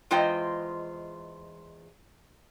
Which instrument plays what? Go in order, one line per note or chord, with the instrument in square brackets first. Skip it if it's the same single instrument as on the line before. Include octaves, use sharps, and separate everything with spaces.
[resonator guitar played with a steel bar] E2 G#3 F4 C5 D#5 G5